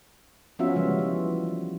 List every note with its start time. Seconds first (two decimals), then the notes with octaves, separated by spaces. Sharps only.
0.59 F3 B3 C#4 F4 F#4 E5
0.76 C#3 E3 F3 G3 G#3
0.99 E3